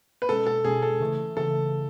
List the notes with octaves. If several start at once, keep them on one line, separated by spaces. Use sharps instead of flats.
B4
B2 G#3 C#4 A4
A4
B2 G#3 C#4 G#4
A4
C#3 E3 A3
C#3 E3 A3 A4